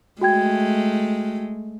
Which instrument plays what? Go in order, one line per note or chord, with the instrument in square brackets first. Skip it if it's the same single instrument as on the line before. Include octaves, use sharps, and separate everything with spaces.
[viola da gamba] G#3 A3 [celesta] F#4 G5 G#6